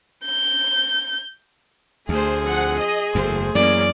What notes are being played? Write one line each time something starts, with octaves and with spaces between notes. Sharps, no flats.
G6
D2 A3 G#4 C5
F3 C4 F#5
D#5
F#1 E2 A3 C5
F#2 E3 A#3 C#4 D5